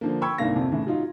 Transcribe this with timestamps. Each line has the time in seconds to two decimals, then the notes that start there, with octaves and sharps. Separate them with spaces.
0.01 D3 F3 A#3
0.21 G5 B5 C#6 E6 G#6
0.38 C2 G#2 D3 A#3 F5 A#6
0.56 F2 C3
0.72 A2 C#3 E3
0.87 F#3 D#4 F4